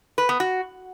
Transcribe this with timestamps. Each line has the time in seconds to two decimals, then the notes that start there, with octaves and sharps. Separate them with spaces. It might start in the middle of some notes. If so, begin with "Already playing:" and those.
0.18 B4
0.29 B3
0.40 F#4